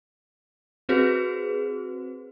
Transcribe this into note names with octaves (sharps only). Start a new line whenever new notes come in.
C4 F#4 G#4 B4 C5